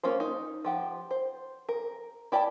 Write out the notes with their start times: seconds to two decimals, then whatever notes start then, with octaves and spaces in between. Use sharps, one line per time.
0.03 A#3 C#4 F4 C5
0.20 D#4
0.65 F3 G4 F#5
1.11 C5
1.69 A#4
2.32 E4 G4 D5 D#5 A5